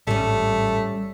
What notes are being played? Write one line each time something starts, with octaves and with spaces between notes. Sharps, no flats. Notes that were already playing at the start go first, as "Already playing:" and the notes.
A1 G#2 G3 A3 C#4